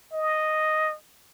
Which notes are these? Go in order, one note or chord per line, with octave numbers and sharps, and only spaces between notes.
D#5